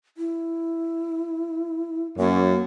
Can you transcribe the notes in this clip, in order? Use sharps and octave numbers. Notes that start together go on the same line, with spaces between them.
E4
F#2 A#3